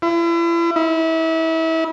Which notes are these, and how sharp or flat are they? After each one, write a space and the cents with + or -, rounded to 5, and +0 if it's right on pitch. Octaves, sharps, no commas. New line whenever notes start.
E4 +40
E4 -30